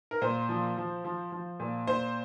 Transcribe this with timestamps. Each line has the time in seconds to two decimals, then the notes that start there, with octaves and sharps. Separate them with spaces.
0.11 A#4
0.22 A#2 C5
0.49 F3
0.77 F3
1.05 F3
1.32 F3
1.60 A#2
1.87 A#2 C5